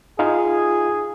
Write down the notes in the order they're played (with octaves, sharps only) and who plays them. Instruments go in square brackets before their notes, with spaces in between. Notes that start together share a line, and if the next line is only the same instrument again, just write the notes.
[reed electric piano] D#4 F4 F5 [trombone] G#4